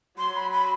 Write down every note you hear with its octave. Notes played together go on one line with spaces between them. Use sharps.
F#3 C6
B5
B5